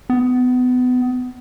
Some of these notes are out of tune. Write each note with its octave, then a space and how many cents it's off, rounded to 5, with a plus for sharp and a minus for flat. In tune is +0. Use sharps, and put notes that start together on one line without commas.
B3 +25